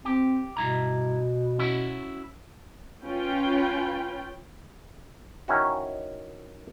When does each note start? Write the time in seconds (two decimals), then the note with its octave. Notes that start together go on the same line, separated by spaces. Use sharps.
0.05 C4 G4
0.57 G2 B2 E4 A#5
1.59 C#4 E4 F#4
3.04 C#4 F4 B4 G5
5.48 D#3 C#4 E4 F#4